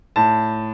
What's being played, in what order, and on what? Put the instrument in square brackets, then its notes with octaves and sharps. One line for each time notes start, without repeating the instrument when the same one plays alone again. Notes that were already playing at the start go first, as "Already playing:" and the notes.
[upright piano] A2 A5